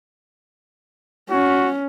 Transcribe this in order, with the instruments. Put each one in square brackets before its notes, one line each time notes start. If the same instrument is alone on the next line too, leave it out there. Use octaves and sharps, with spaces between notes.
[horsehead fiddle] C#4 [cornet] F#4